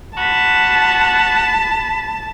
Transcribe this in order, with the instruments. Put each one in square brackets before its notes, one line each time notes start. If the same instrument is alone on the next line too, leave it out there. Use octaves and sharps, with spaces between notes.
[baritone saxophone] F#4 [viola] A5 [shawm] B5